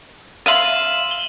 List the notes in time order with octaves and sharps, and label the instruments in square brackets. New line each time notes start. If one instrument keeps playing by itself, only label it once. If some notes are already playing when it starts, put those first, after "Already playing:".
[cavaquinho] E5 F5 C6 [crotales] D#7 E7 F#7
[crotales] G7